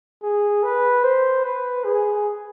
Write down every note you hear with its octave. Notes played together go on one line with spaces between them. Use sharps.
G#4
B4
C5
B4
G#4